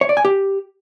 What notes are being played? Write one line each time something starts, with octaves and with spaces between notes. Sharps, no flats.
C#5
D5
G#5
G4